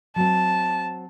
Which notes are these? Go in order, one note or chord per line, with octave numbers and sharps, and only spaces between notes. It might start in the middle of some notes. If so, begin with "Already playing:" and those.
F#3 C4 A5